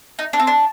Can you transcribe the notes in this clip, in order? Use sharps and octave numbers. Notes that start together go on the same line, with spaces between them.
D#4
D4
C4
D4